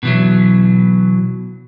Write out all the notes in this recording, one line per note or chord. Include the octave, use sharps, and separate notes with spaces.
B2 E3 F#3